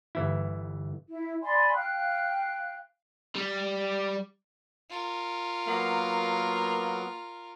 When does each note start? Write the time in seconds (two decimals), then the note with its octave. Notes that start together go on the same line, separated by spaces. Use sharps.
0.15 G1 E3 E4
1.09 E4
1.43 D5 G#5 B5 C6
1.74 F5 G5 F#6
3.36 G3
4.90 F4 A#4
5.67 F#3 A#3 B3